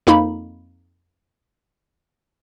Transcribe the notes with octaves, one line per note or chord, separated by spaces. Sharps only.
F2 A#3 D#4 B5